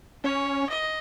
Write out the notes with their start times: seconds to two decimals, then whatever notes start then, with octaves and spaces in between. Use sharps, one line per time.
0.24 C#4 C#5
0.70 D#5